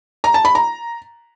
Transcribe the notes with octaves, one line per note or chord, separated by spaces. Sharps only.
A#5
A5
B5
A#5